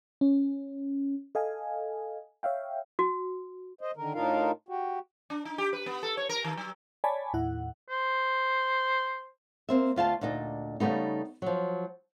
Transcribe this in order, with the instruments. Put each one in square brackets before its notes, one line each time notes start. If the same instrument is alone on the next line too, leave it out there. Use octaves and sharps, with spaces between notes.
[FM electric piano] C#4
A4 D#5 F5 G#5
C#5 E5 F5 G5
[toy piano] F#4
[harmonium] C5 D#5
D3 D#3 A#4
A2 D4 D#4 F4 A#4 F5
F#4 G4
[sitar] D4
D#4
G4
B4
B3
A4
C#5
A#4
D#3
F#3
[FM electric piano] C#5 D5 G#5 A5 B5
D#2 A2 E4 F#5
[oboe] C5
[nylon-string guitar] A#3 C4 E5
D2 F4 F5 A5
D2 A#2 D4 D#4 D#5
C#3 G3 A3 B3 D#4
F3 F#3